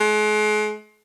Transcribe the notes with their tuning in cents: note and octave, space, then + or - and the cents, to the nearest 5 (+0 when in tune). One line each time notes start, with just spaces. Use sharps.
G#3 +40